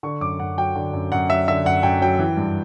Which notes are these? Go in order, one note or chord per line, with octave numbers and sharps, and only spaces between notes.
D3 C#6
F#2 D6
F#2 F#5
F#3 G5
D3
F#2
F#2 F#5
F#3 E5
D3 E5
F#2 F#5
F#2 G5
F#3 G5
E3
G2